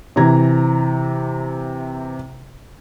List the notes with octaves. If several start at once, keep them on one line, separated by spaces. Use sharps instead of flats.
C3 E3 A#5 G#6